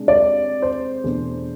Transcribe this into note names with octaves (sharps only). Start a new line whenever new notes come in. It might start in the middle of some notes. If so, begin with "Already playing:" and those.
Already playing: C3 G#3 D4
D5
C5
E2 B2 A3 D4